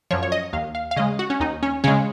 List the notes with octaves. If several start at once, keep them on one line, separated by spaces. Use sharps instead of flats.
F#2 F3 C#5
C#5
D#5
D#2 F5
F5
F5
C#3 G#3 D#5
F#4
C#4
D#2 D#4
C#4
C#3 G#3 C#4